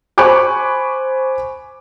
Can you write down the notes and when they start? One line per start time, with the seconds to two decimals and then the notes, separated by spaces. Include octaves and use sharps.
0.18 C5 G#5 B5 C#6 D6 F#6